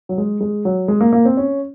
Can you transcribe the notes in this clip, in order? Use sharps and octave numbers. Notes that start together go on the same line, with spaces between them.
F#3
G#3
G#3
F#3
G#3
A#3
A#3
C4
C#4